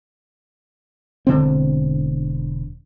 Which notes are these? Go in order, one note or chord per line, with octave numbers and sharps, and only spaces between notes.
E1 D3 C4